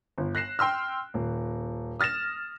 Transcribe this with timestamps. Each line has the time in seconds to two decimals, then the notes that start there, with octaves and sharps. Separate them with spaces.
0.18 G1
0.35 F#6 A#6 C7 E7
0.59 G5 C6 E6 F6
1.14 D#1
2.00 D#6 F6 A6 A#6 E7